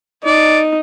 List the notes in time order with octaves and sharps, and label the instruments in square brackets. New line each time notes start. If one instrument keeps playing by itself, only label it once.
[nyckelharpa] D#4 [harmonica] D5